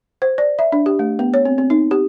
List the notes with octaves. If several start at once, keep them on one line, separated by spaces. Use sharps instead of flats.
C5
D5
E5
D4
G4
A3
B3
C#5
C4
C4
D#4
G4